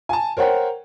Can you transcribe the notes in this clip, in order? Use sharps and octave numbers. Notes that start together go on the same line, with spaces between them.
G#5 A5
A#4 C5 C#5 F#5 G5